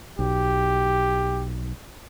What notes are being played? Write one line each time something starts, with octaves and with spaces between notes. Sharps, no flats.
B1 G4